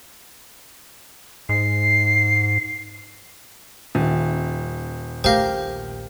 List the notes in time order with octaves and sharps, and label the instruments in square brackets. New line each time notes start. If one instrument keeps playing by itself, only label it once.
[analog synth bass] G#2 [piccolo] C7
[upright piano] D#1
[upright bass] A#1 A3 [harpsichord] G4 A#4 G5 [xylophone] C5 F5